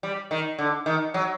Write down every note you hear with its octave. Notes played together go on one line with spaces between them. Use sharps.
G3
D#3
D3
D#3
F#3